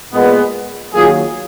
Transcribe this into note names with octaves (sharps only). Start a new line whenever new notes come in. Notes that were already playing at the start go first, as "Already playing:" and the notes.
A#2 G#3 B3
D#3 F#3 A#3 F4 G#4